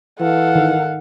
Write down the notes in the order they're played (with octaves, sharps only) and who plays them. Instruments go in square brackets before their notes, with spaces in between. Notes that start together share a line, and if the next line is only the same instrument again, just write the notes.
[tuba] E3 [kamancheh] A4 F5 [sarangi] F#5
[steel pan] D#3